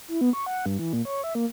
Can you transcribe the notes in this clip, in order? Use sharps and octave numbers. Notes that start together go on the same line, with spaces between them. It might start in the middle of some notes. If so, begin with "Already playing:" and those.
E4
B3
C#6
F#5
G2
E3
A#2
C#5
E5
A#3